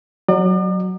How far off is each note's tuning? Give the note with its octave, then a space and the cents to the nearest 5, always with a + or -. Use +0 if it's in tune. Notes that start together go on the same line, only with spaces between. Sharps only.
F#3 +0 D5 +45